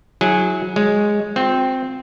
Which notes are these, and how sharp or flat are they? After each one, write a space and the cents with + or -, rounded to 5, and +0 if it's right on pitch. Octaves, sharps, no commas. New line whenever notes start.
F#3 -15 E4 -25 G#4 +0
G#3 +0 C#5 +0
C4 -5 F4 +45